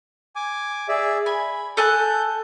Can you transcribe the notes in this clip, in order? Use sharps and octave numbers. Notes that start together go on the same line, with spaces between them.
G#5 D6
G#4 D5 E5
G#5 B5
A4 G#5 F#6 G6